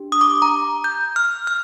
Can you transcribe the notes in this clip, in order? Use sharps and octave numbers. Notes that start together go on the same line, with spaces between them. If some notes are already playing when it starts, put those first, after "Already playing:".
Already playing: D4 G4
D#6
D6
A#5
G6
F6
F6